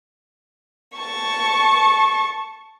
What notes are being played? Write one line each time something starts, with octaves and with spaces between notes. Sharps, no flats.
A5 C#6